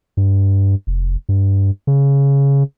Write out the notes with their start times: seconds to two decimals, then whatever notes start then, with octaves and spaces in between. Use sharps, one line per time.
0.17 G2
0.87 F1
1.29 G2
1.87 C#3